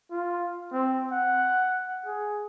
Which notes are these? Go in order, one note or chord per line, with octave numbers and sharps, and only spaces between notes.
F4
C4
F#5
G#4